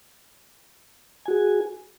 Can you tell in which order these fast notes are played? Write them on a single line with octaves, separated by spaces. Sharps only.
G#5 F#4 G#4